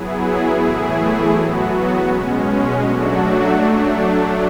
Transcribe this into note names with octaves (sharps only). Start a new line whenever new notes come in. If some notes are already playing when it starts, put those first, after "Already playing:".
Already playing: F#3 B3 E4 G#4
A2 E3 A3 E4 G#4
F#3 B3 F#4
B2 G#3 C#4
F#3 A3 D4 F#4
F#3 A3 D4